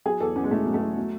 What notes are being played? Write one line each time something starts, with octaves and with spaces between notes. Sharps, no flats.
F#3 G#4
E2 A4
E2 C#4
G#3
B2 A3
F#3
A3
E2
F#3